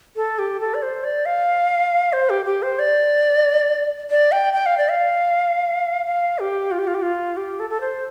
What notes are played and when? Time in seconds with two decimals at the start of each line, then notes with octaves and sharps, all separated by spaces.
0.16 A4
0.39 G4
0.60 A4
0.74 D5
0.82 C5
1.04 D5
1.26 F5
2.13 C5
2.30 G4
2.46 G4
2.63 C5
2.79 D5
4.10 D5
4.32 G5
4.54 G5
4.66 F5
4.78 D5
4.90 F5
6.06 F5
6.39 G4
6.71 F4
6.79 G4
6.87 F4
6.94 G4
7.02 F4
7.37 G4
7.60 A4
7.70 A4
7.81 C5